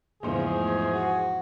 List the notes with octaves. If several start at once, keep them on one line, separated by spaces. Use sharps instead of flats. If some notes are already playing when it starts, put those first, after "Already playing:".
E2 G#2 C#3 F3 G#4
A3
F#4